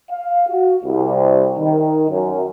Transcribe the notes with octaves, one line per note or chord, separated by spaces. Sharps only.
F5
F#4
C2
D#3
F#2